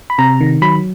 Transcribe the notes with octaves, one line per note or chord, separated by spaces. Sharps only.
B5
C3 A#5
D#3
F#3 B5